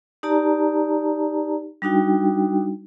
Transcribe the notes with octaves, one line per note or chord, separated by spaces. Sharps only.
D#4 G4 D5 A5 A#5
G3 D4 D#4 F#4 G5